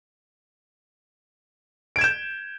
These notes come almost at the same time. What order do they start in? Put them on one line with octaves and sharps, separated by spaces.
D7 G#6 E7 G6